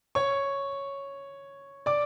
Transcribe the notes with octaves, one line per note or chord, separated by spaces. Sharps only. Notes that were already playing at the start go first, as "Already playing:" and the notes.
C#5 C#6
D5 D6